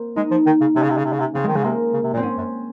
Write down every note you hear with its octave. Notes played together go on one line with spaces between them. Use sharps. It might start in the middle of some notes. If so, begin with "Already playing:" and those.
Already playing: A#3 C4
G#3 D#4
F3
D#3
C#3
C3 C#4
C#3
C3
C#3
C3
C#3
C3
C#3 C4
D#3 G#3
C#3 G#3
C3 A#3
C#3
C3
A#2
C4
G#2 C#4
F#2